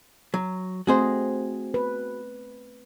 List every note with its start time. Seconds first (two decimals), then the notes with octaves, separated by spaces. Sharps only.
0.34 F#3
0.87 A3 C4 F#4 G#4 C5 D#5
1.74 B4